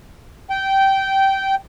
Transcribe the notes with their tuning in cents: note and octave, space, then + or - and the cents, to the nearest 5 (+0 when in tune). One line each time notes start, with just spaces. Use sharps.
G5 -15